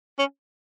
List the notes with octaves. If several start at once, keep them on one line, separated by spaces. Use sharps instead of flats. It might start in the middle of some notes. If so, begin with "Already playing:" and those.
C#4